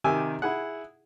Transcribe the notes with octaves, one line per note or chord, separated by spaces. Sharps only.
C3 D#3 G4 G#5 E6
E4 G#4 F#5